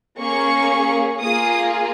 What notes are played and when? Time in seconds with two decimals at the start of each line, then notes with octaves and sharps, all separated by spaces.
0.19 A#3 C#4 G#4 C#6
1.21 A#3 F4 G#4 D#6